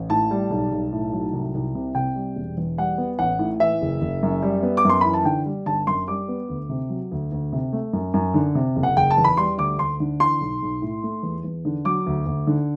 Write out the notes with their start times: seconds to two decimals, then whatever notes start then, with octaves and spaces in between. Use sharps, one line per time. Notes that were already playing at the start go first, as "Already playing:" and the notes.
Already playing: A1
0.10 A2 A5
0.31 G3
0.50 B1
0.72 B1
0.93 A2
1.13 F#3
1.33 C2
1.54 C2
1.75 C3
1.95 C3 G5
2.15 G3
2.36 E1
2.57 E2
2.78 G3 F#5
2.98 B3
3.19 A1 F#5
3.39 A2
3.60 E3 E5
3.82 F#1
4.01 F#1
4.23 F#2
4.42 G3
4.63 B3
4.77 D6
4.85 F#2 C6
5.01 E3 B5
5.14 A5
5.25 D3 G5
5.46 G3
5.66 G1 A5
5.87 F#2 C6
6.08 G3 D6
6.28 B3
6.49 D2
6.69 C3
6.90 F#3
7.12 D2
7.32 D2
7.53 C3
7.73 A3
7.93 F#2
8.14 F#2
8.34 D3
8.55 C3
8.76 F#1
8.83 F#5
8.96 F#1 G5
9.11 A5
9.17 E2
9.24 B5
9.37 G3 C6
9.58 D2 D6
9.78 D2 C6
10.00 D3
10.20 E3 C6
10.40 B1
10.62 B1
10.82 A2
11.03 A3
11.23 E2
11.44 E2
11.65 D3
11.85 F#3 D6
12.07 D2
12.26 D2
12.47 D3